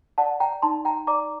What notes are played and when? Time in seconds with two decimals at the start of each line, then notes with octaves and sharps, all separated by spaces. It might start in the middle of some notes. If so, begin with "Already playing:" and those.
0.18 D5 F#5 A5
0.40 G5 A#5
0.62 D#4 A5 C6
0.85 G5 A#5
1.07 D5 A#5 D6